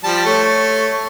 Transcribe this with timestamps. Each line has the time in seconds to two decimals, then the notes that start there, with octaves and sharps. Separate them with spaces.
0.04 F3 G3 A5
0.25 A3 C#5